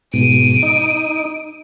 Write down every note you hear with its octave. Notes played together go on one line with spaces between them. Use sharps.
G#2 B2 D7 D#7
D#4